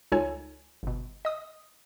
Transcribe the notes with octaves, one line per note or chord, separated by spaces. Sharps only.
C#2 D#4 F4 A4 C#5 G#5
G1 B2
D#5 D#6